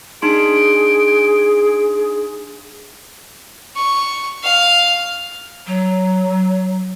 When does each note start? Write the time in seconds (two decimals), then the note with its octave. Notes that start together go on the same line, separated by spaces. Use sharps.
0.22 D4 D#4 G#4 C6 D7
3.76 C#6
4.43 F5
5.67 F#3